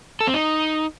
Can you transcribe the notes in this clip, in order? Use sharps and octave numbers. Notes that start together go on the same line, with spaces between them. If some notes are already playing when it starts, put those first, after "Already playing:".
A4
C4
D#4